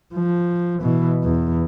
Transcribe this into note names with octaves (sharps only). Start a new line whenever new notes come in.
F3
B2 E3
E2